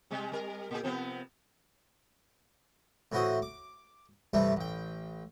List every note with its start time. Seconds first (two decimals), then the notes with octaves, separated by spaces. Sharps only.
0.11 C3 G3 G#3
0.32 G3 A#4
0.71 A#2 G#4
0.83 C3 F3 B3
3.12 A2 E3 E4 F#4 C5 D#6
3.42 D6
4.33 G2 C3 E3 G3 A3
4.57 A1 G5